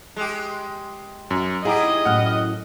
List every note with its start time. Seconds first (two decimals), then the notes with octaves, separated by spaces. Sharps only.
0.16 G#3 G4
1.31 F#2
1.65 D#4 E4 G4 G#4 D#5 E5 F#5 A#5
2.05 F#2 A2 F#5 F6